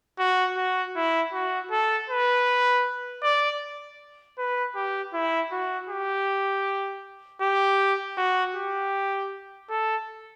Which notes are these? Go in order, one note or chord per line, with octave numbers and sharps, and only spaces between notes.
F#4
F#4
E4
F#4
A4
B4
D5
B4
G4
E4
F#4
G4
G4
F#4
G4
A4